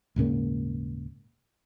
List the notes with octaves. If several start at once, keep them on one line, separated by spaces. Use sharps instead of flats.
D#1 G#2 C#3 A#3